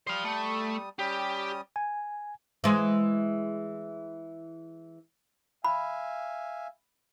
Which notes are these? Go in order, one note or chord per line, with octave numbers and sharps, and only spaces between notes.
G3 C5 F5 D#6
A3
G3 C#4 G4 D#6
G#5
E3 G#3
E5 F5 G#5 B5